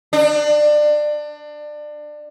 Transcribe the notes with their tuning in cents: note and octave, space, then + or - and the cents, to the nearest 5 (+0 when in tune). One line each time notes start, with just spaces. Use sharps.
D4 +25